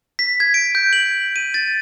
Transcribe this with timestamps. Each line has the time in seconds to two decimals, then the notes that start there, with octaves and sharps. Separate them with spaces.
0.19 B6
0.40 G#6
0.54 D7
0.75 G6
0.93 F#7
1.36 D#7
1.54 A6